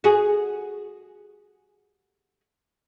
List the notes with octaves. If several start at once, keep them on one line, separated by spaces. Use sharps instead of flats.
F#4 G#4